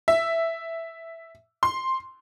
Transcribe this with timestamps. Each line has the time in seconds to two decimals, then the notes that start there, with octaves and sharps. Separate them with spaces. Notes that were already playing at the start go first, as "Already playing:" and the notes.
0.08 E5
1.63 C6